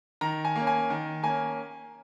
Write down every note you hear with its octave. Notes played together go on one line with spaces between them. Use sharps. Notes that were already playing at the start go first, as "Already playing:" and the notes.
D#3 A#5
G#5
A#3 C#4
G#5
D#3
A#3 C#4 G#5